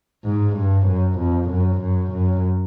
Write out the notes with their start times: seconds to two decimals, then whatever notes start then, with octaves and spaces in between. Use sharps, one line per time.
0.25 G#2
0.56 G2
0.87 F#2
1.19 F2
1.50 F#2
1.81 F#2
2.12 F#2